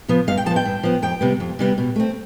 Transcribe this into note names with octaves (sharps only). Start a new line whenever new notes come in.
C3 F3 B3
G2 F5
G5
F3 B3 A5
G5
G2
F3 B3
F2 G5
C3 G3 B3
F2
C3 G3 B3
B2
A3 C4